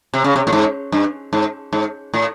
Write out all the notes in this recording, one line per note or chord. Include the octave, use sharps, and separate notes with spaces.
C3
C#3
C3
A2
G#2
G2
G#2
G#2
A2